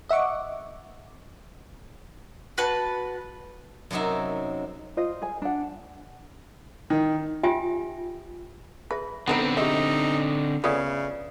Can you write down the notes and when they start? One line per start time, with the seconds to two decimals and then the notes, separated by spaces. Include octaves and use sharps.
0.09 D#5 E5 F#5 C#6 D6
2.58 F#4 B4 A5
3.91 F#2 C3 F#3 D#4 E5
4.97 F4 C5 D#5
5.22 G#4 G#5
5.42 D4 F#5
6.90 D#3
7.43 F4 G4 E5 G5 G#5
8.91 G#4 B4 E5
9.28 D3 B3 C4 D#4 A4 B4
9.57 D#4 G4 G#4 E5
10.64 C#3 A3 B3 C#4 F4 D5 D#6